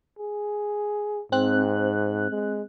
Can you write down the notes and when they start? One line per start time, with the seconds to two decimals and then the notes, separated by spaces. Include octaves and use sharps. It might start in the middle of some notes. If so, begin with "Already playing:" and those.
0.19 G#4
1.32 G#2 C4 F#6
2.30 G#3